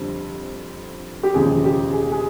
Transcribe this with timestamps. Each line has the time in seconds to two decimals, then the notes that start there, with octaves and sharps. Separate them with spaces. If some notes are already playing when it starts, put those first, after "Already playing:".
Already playing: F2 D3 G3 C4
1.23 G4
1.34 E1 D#2 C#3 F3 G#4
1.64 G4
1.93 G#4
2.12 G#4